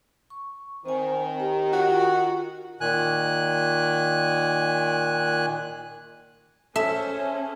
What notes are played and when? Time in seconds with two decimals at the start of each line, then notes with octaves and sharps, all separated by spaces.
0.30 C#6
0.86 D#3 C4 C5 G#5
1.40 G4 A#5
1.73 F4 F#4
2.81 A#2 D#3 G#5 F#6
6.76 C#4 G#4 A4 C5 E5